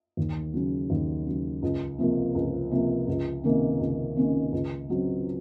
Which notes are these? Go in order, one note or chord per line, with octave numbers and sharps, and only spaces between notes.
D#2
C#3 F#3
D#2
C#3 F#3
C#2
C3 F3 A#3
C#2
C3 F3 A#3
C#2
C3 D#3 A#3 C#4
C#2
C3 D#3 A#3 C#4
C#2
C#3 F#3 C4